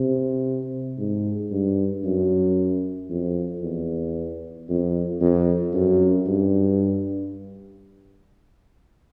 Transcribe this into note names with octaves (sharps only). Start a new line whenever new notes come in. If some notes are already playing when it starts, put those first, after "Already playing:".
Already playing: C3
G#2
G2
F#2
F2
E2
F2
F2
F#2
G2